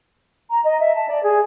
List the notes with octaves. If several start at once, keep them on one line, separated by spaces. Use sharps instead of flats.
A#5
D#5
E5
A5
D5
G#4